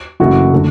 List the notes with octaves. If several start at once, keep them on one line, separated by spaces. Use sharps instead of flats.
F#1 F#2 E3 A3 F#4
D3 A3